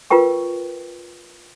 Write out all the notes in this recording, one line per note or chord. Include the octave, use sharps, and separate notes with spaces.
F4 A#4 B4 G5 C#6